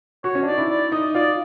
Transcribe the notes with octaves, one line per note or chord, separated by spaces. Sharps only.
F#4 C#5
C#4
D4
D#4 D5
E4
D5
D#4 D#5
F4 D5